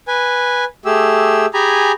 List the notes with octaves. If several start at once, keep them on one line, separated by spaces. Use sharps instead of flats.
B4 G#5
A3 G4 G#4 E6
G4 G#4 G#5 A#5 B5